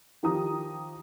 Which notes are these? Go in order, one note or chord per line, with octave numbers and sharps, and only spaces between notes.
D#3 F3 G4 A#5 D#6